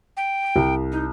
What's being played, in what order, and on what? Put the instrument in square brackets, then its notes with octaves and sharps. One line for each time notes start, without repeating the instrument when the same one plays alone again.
[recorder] G5
[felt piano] C2
[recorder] D#4